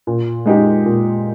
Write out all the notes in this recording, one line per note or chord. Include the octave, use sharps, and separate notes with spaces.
A#2
G#3 D#4 G4
A#2